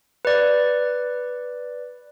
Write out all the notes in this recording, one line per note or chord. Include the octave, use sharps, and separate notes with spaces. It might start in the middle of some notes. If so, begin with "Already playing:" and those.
B4 D5